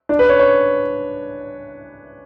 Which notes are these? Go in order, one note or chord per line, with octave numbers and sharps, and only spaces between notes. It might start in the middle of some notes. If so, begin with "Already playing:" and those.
D4
B4
C#5
C#5